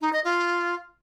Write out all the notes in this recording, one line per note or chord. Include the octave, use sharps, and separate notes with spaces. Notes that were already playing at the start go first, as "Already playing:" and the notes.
D#4
D#5
F4